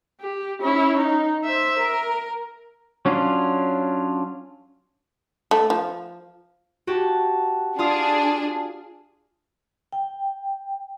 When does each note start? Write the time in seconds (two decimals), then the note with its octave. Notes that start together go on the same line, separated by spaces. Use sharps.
0.20 G4
0.62 C#4 E4
0.97 D#4
1.44 C5 E5
1.79 A#4
3.05 F#3 C#4 D4 F4
5.51 A3
5.70 F3
6.87 F#4 G4 A5
7.79 D4 F4 G#4 F5 D#6
9.93 G5